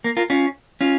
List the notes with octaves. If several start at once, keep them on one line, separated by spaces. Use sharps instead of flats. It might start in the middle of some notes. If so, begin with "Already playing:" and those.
A#3
F4 A#4
C#4 F4
C#4 F4